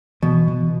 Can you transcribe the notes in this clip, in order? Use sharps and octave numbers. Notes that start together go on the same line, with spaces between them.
B2 E3
E3